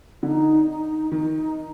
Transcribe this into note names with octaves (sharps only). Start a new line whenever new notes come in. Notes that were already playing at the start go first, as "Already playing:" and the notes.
D3 D#4
D#4
D#3 D#4
D#4